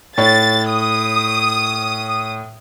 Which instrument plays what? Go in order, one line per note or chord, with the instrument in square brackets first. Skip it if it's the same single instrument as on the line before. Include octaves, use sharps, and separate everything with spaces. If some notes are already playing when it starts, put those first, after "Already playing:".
[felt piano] A2 C#5 [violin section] A6
[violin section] D#6